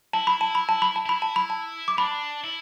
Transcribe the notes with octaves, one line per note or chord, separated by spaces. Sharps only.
E4 A5
B5
A5
B5
A5
B5
A5
E4 B5
A5
B5
A5
D6
D4 B5
E4